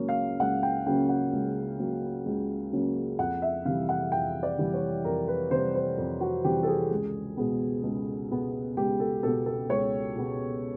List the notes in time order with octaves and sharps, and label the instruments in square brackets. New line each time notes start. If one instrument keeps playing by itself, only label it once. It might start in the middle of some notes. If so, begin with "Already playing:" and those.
Already playing: [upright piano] C#2 C#3 F#3 A#3 C#4
F5
C#2 F#5
G5
C#3 F#3 A#3 C#4 G5
F#5
C#2
C#3 F#3 A#3 C#4
C#2
C#3 F#3 A#3 C#4
F2 F#5
E5
C3 E3 G3 F5
F#5
F2 G5
D5
C3 E3 G3
C#5
F2 A#4
B4
C3 E3 G3 C5
C5
F2
F#4
C3 E3 G3 G4
A4
G#4
C#2
B2 G#3 B3
C#2
B2 G#3 B3
C#2 G4
A4
B2 G#3 B3 A4
A4
C#2 C#5
B2 G#3 B3